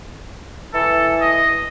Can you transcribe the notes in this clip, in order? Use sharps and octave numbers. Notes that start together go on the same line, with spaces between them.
E3 A4
D#5